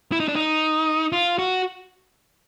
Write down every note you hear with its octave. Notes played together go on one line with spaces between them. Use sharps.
E4
D#4
D4
D#4
F4
F#4